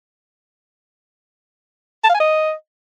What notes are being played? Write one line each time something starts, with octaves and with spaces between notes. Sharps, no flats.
A5
F5
G#5
D#5